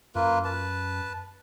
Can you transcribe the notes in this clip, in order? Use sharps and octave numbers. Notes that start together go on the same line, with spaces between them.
F#2 A#3 F4 B4
B4 A5